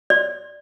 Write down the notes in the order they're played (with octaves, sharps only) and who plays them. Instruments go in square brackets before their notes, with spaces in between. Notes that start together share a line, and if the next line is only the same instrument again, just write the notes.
[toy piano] D5